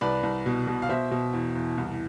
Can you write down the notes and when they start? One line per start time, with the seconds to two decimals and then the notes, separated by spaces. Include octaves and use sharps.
0.01 C2 B4 D5
0.23 C2
0.46 B2
0.67 B2
0.82 F5
0.89 B2 C5 E5
1.11 B2
1.34 E2
1.55 E2
1.78 C2